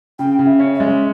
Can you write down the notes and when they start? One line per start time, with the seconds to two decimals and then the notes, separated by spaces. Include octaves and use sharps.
0.19 C#3 G5
0.39 C#3
0.46 E5
0.59 C#4
0.74 E5
0.80 G#3